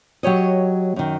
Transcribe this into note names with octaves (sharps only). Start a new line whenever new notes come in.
F#3 G4 C#5 D#5
F#2 D#3